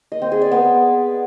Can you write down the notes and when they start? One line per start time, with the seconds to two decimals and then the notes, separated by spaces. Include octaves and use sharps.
0.12 D#5
0.22 C4
0.32 G#4
0.42 D5
0.52 B3